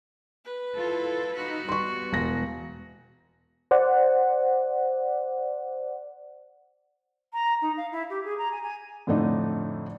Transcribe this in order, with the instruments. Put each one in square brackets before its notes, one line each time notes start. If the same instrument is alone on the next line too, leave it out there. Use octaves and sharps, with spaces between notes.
[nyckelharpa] B4
[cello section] E4 F4 A4
[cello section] D#4 B4 [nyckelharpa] F#4
[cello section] G3 B3 [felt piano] C6 C#6
[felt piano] E1 A#6
[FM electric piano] C5 D5 F#5
[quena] A#5
D#4
F5
E4
G4
G#4
A#5
G#5
G#5
[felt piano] F2 A2 D3 A3 D4 D#4